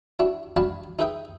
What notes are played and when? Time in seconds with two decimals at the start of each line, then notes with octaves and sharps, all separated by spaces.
0.19 D4 E4 F#4
0.56 D4 F#4 F5 G#5 A5 B5
0.99 D#4 G#4 B4 E5 G5 D#6